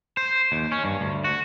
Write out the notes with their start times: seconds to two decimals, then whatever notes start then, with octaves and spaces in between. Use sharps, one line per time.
0.17 C5
0.52 D#2
0.72 C#4
0.84 G2
1.01 D2
1.24 F#4